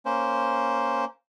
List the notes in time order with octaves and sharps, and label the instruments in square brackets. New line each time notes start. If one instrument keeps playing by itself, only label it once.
[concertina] A#3 C#4 C5